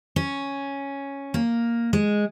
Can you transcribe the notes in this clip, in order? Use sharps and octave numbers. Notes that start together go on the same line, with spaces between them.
C#4
A#3
G#3